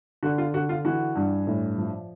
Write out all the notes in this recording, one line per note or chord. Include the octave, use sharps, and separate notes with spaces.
D3 F#4
F4
D3 F#4
F4
E3 F#4
G2
A2
F3